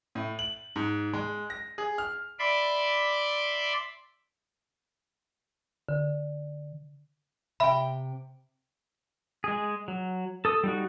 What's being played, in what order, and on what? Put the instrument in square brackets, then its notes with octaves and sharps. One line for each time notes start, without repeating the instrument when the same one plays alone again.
[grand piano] A2
F#7
G#2
G#3
A#6
G#4
F6
[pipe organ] D5 E5 B5 C6 D6
[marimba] D3
[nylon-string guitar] C3 G5 [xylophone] E5 B5
[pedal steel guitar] G#3 G#4
F#3
A4 D#6
G3 D#4 F#4